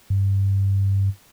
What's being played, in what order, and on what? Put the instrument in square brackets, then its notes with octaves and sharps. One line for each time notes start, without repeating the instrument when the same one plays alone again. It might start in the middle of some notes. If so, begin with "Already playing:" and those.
[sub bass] G2